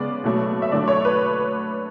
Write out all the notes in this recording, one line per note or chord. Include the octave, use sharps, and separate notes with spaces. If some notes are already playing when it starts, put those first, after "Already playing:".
Already playing: C#3 G#3 B3 D5
B2 F#3 A3
E5
D3 F#3 A3 D5
C#5
B4